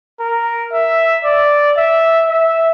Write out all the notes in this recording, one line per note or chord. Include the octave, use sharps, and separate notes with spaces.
A#4
E5
D5
E5
E5